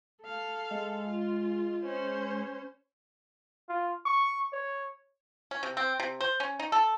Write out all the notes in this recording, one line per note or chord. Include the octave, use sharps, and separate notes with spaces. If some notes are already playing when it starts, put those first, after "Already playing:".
A4 F5
G#3
F4
C#4 C5
F4
C#6
C#5
C#4
C3
C4
C3
C5
C#4
D#4
A4